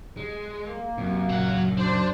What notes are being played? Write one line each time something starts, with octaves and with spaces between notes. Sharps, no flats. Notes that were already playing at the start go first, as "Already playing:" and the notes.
G#3
A#3
F#2 C3
A#1 C#3 F#3 F#5
D4 C5